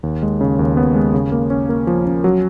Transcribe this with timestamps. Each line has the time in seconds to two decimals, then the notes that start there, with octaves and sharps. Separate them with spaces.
0.03 D#2
0.23 G#3
0.41 C#3
0.59 D#2
0.77 B3
0.95 G#3
1.14 C#3
1.32 A#3
1.50 C#4
1.69 A#3
1.87 F3
2.06 C#4
2.24 F#3